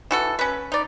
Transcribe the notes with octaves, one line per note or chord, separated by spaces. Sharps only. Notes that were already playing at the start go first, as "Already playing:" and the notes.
E3 F#4 A4
C#4 B4
D#4 D5